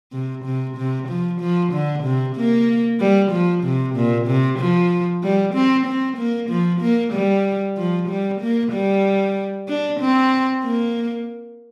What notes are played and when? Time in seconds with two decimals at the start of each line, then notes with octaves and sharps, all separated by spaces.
0.13 C3
0.45 C3
0.77 C3
1.09 F3
1.41 F3
1.73 D3
2.04 C3
2.36 A#3
3.00 G3
3.32 F3
3.64 C3
3.95 A#2
4.27 C3
4.59 F3
5.23 G3
5.54 C4
5.87 C4
6.18 A#3
6.50 F3
6.81 A#3
7.13 G3
7.77 F3
8.09 G3
8.41 A#3
8.73 G3
9.68 D4
10.00 C4
10.64 A#3